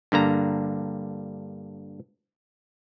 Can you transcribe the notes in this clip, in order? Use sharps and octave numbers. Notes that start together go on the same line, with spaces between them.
G2 D3 A#3 A#5